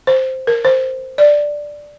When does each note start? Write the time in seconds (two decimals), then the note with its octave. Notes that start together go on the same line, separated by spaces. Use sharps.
0.07 C5
0.47 A#4
0.65 C5
1.18 D5